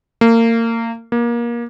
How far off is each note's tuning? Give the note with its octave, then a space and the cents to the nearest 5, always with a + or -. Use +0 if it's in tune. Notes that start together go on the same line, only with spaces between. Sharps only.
A#3 -30
A#3 +25